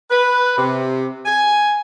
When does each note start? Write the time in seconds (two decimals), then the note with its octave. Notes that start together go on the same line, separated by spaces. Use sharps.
0.10 B4
0.57 C3
1.25 G#5